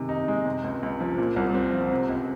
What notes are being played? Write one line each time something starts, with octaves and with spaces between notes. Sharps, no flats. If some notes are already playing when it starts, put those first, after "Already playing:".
Already playing: C3 D#3 G#3
D#4
G#3
C3
C#2
C#2
F3
A#2
C2
C4
F3
C3
C#2